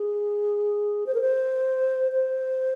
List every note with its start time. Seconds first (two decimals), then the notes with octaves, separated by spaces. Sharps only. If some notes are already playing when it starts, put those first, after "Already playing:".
Already playing: G#4
1.06 C5
1.14 A#4
1.21 C5
2.12 C5